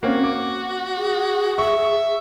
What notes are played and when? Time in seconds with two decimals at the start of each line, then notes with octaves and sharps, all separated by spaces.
0.03 A#3 C4 C#4 F#4
0.24 D6
0.97 G#4
1.58 E5 C#6